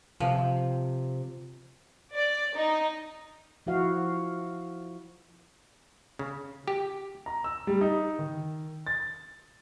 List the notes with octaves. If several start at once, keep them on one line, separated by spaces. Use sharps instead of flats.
C3 F3
D5
D#4
F3 E4 F#4 F5
C#3
G4
A#5
E6
G3
D#4
D#3
A6